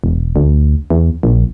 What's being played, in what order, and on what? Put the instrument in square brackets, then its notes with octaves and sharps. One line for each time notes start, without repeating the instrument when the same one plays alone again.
[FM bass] E1
D2
E2
A#1